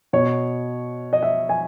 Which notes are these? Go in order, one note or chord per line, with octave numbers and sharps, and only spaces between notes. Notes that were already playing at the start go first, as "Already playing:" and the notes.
B2 C#5
D#5
E5
G#5